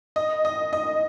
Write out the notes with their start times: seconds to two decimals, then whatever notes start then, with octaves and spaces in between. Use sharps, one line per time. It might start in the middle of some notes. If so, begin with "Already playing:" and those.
0.16 D#5
0.45 D#5
0.73 D#5